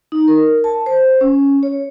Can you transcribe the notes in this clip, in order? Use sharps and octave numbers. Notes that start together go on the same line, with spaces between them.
D#4
A#4
A5
C5
C#4
C#5